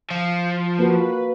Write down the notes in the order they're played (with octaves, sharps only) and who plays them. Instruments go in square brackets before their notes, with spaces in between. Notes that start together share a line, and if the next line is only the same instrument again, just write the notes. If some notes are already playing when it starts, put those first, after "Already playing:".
[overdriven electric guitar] F3
[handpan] A#3 F#4 [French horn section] B4